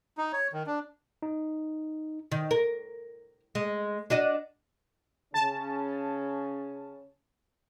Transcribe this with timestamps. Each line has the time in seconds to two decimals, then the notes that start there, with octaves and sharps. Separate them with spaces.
0.18 D#4
0.33 C#5
0.53 D#3
0.67 D4
1.22 D#4
2.32 D#3
2.51 A#4
3.55 G#3
4.10 D4 F#4 D#5
5.34 C#3 C#4 A5